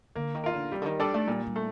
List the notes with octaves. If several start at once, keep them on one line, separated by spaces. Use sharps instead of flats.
D3 A#3
D#3
F4 A#4
D3
C3 G3
D3
D#3
G3 D4 A4 D5
A3
A#2 G3
G3
A3